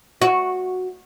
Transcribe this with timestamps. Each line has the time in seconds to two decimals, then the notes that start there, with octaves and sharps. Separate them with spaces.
0.22 F#4